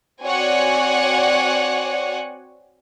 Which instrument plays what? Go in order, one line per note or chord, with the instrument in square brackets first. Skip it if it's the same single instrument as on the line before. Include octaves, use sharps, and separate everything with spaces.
[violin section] C4 F#4 C#5 D5 F#5 G#5